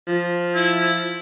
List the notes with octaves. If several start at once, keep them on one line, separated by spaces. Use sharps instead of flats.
F3
E4